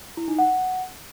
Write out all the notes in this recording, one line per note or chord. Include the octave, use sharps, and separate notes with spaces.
E4
D#4
F#5